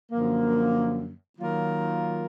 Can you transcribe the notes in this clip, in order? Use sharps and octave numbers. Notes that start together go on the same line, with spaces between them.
F#2 D3 F3 A#3
D#3 F#3 A#3 F4 A#4